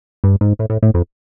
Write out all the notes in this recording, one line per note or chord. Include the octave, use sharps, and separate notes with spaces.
G2
G#2
A2
A2
A2
F2